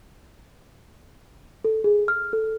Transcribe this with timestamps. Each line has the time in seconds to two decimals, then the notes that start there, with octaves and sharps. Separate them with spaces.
1.65 A4
1.84 G#4
2.08 F6
2.33 A4